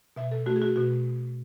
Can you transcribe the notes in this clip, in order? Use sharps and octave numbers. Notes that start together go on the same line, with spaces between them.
B2 E5
A4
A3 F#4
G#4
F#4
B2 F#4